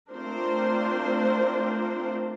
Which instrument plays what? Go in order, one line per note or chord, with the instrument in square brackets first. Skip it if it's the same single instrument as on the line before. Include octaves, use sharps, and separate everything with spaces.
[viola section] A3 C4 D4 F4 A#4 C5